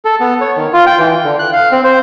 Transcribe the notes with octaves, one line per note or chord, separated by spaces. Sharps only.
A4
B3
C#5
D#3
F4
G5
E3
D3
F#6
F5
C4
C5